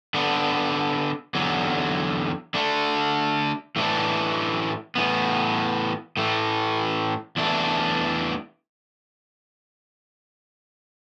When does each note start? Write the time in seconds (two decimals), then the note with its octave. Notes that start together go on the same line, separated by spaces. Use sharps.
0.14 D3 B3 D4
1.35 E2 D3 F#3
2.54 D3 A3 D4
3.76 A2 E3 A3 D4
4.95 A2 E3 B3
6.17 A2 E3 A3
7.37 E2 E3 A3 D4